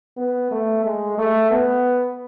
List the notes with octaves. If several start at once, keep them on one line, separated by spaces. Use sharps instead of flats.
B3
A3
G#3
A3
B3